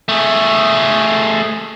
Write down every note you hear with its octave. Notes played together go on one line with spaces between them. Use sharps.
A3 G#4